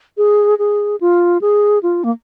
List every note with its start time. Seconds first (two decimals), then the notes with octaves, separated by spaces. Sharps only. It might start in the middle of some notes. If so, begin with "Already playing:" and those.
0.17 G#4
0.59 G#4
1.01 F4
1.41 G#4
1.83 F4
2.04 A#3